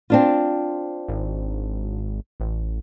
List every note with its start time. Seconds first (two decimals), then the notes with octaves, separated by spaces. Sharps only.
0.10 C4 D4 F4
1.08 G#1
2.40 A1